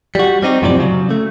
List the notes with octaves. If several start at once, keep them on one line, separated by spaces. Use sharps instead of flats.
G3 F#4
G3 C4 D#4 G4
F#2 A2 C3 F3 C4 D5
C#3 F#3
A3